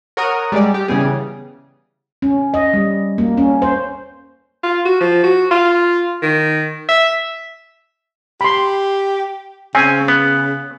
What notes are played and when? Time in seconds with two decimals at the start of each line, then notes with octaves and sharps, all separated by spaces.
0.17 A#4 C#5 F#5 A#5 D#6
0.52 G3 G#3 D5
0.74 G4
0.88 C#3 E3 G3 B3 G#4
2.22 C#4
2.54 D#5
2.74 G3
3.18 A#3
3.37 C#4
3.62 C5
4.63 F4
4.85 F#4
5.00 F3
5.24 F#4
5.51 F4
6.22 D#3
6.88 E5
8.41 G4 B5 C6
9.75 C#3 C4 C#4 G#5
10.08 B3